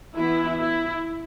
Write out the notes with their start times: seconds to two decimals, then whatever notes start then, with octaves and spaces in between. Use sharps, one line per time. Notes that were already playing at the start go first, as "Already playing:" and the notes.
0.16 E3 B3 E4
0.59 E4